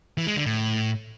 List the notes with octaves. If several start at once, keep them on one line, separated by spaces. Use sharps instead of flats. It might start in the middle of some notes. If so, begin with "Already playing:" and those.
E3
G#3
D3
A2